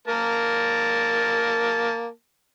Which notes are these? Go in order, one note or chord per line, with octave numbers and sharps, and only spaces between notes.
A#3 A#4 A5